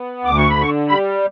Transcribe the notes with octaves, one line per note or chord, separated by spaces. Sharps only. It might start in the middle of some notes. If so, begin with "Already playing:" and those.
Already playing: B3
D2 D6
C#6
B5
D3 C#6
G3 B5